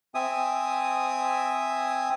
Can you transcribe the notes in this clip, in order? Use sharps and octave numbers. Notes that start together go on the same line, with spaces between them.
C4 E5 G#5 D#6